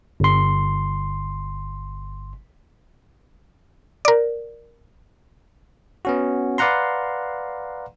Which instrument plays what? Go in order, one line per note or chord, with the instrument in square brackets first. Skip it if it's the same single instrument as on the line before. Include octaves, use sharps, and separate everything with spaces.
[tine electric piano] G1 C6
[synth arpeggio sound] A#4 D5
[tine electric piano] B3 C#4 F#4
B4 D5 F5 F#5 A#5 C6